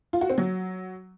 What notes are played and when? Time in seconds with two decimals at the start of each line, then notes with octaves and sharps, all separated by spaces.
0.13 F4
0.21 F#4
0.30 C4
0.38 F#3